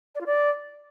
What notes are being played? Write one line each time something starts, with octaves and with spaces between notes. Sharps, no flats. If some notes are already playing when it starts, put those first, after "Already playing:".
D5
F4
D5